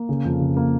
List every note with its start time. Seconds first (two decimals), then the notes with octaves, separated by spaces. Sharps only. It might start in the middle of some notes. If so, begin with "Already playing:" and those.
Already playing: A#3
0.09 C#3
0.25 F2
0.41 C#3
0.57 A#3